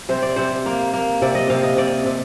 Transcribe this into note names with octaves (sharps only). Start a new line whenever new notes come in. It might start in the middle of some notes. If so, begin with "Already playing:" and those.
C3 C5
D5
C3 C5
A#3
A#3
C3 D5
D#5
C3 F5
D#5
C3 D5
C3